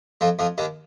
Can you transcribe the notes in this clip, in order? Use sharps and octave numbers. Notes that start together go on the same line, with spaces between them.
F2 F3
F2 F3
D#2 D#3